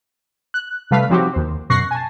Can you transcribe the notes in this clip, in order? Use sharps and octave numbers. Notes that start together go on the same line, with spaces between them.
F#6
C3 G3 A3 B4 F5 B6
F3 F#3 C4 D#4 F#4 G4
D#2 C5
F#2 B2 C#6 F#6 A#6 C7
G#5 A5